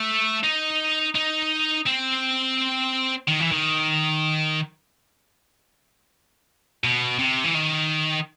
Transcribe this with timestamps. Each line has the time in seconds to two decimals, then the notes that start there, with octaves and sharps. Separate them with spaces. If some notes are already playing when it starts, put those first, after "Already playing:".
Already playing: A3
0.44 D#4
1.15 D#4
1.86 C4
3.28 D#3
3.40 E3
3.51 D#3
6.84 B2
7.19 C3
7.44 E3
7.54 D#3